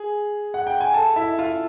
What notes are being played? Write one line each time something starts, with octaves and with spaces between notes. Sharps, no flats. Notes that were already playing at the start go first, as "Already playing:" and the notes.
Already playing: G#4
F#5
G5
G#5
A4 A5
E4 E5
F4 F5